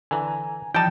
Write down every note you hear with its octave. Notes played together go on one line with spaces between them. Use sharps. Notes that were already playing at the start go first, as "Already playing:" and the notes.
D3 E3 G#5 A#5
E3 F3 G3 D#4 G4 G5 A5